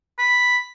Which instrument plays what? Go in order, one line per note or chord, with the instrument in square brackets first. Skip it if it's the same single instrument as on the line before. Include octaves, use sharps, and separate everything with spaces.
[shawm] B5